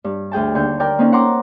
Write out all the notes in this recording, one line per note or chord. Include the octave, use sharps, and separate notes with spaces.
G2
D2 G#4 G5 A5
D#2 D3 G6
A#4 D5 G5
A#3 C4 C#4 D#4 A4
F#5 A#5 C6 D6